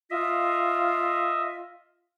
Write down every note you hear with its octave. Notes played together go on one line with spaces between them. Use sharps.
F4 D#5 E5